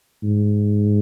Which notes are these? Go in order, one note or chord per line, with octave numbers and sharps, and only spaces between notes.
G#2